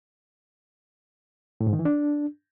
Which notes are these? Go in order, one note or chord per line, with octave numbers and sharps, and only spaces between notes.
A2
G#2
D#3
E3
D4